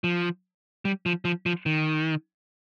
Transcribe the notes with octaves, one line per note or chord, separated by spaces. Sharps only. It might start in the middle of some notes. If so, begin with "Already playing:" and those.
F3
G3
F3
F3
F3
D#3